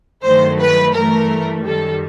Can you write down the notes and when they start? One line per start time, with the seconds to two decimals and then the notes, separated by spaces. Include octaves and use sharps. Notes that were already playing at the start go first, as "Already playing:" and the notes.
0.24 G2 D#3 F#3 A3 C5
0.60 B4
0.94 G2 E3 A3 A#4
1.64 F#2 D#3 G3 A4